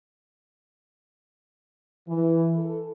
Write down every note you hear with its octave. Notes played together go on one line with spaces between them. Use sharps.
E3
A4